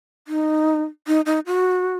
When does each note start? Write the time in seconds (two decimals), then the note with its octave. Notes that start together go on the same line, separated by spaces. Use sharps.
0.28 D#4
1.07 D#4
1.26 D#4
1.46 F#4